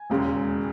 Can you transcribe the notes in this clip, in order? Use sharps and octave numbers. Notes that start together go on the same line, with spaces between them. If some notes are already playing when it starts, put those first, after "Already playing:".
Already playing: G#5
E1 D#2 C#3 G#3